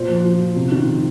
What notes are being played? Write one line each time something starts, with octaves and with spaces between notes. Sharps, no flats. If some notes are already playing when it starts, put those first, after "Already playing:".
Already playing: A#2 C5
F3
F3
F3
C3
D#3
C3